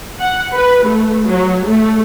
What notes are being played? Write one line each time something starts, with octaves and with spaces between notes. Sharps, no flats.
F#5
B4
A3
F#3
A3